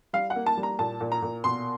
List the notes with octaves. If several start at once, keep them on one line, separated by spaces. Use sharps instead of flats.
G3 F5
F#5
A#3
A5
G3
A#5
A#2 A5
A#2
A#5
A#2
B2 C6